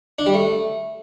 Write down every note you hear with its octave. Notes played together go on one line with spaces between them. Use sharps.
D4
G3
A3